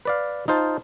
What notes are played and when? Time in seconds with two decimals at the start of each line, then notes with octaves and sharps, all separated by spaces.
0.05 B4 D5 F5
0.48 D#4 F4 C5 A5